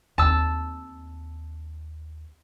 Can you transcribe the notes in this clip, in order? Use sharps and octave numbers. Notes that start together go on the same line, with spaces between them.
D#2 C4 A5 E6